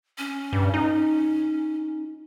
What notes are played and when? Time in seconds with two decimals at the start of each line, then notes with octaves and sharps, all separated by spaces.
0.18 C#4
0.53 G2
0.74 D#4